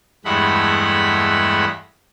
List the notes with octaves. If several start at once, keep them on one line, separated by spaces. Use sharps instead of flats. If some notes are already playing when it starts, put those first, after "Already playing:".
E2 G2 G#3 A3 F#5 B5